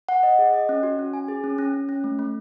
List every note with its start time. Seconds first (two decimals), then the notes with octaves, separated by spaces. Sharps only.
0.09 F#5
0.23 D#5
0.39 G#4
0.54 D#5
0.69 C#4
0.83 F#4
0.99 C#4
1.14 G#5
1.28 G#4
1.44 C#4
1.58 C#4
1.74 C#4
1.89 C#4
2.04 A3
2.19 A3